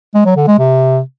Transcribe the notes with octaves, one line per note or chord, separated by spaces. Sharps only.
G#3
F#3
D3
G#3
C3